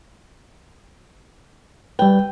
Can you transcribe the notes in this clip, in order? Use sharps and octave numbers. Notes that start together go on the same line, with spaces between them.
G3 B4 G5